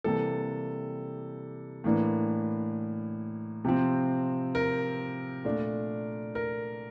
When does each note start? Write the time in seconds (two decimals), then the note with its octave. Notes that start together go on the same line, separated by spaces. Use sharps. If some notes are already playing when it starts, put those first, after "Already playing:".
0.04 C3 E3 G3 A#3 A4
1.84 A2 E3 A#3 D4
3.65 C3 F3 C4
4.55 A#4
5.44 A#2 A3 D4
6.35 A#4